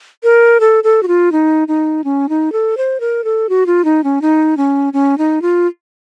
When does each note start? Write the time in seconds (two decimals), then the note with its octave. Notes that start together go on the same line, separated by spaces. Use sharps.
0.23 A#4
0.60 A4
0.84 A4
1.03 F#4
1.08 F4
1.32 D#4
1.68 D#4
2.04 C#4
2.29 D#4
2.52 A4
2.77 C5
3.00 A#4
3.24 A4
3.49 F#4
3.66 F4
3.85 D#4
4.04 C#4
4.22 D#4
4.57 C#4
4.93 C#4
5.18 D#4
5.42 F4